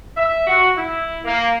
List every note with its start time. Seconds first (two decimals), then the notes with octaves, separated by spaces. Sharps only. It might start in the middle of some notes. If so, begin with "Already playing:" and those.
0.17 E5
0.47 F#4
0.77 E4
1.25 A#3